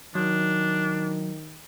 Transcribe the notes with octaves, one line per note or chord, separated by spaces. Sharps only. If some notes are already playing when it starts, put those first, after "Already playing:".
D#3 F#3 D4